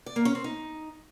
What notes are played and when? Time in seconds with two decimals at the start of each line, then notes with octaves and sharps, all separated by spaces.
0.06 D5
0.16 A#3
0.25 C#4
0.35 C4
0.44 D#4